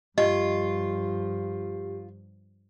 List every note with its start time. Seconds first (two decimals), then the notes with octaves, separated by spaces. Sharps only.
0.18 G2 F3 F4 G4 D#5